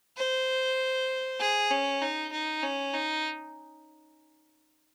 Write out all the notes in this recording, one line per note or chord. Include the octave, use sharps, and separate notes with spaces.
C5
G#4
C#4
D#4
D#4
C#4
D#4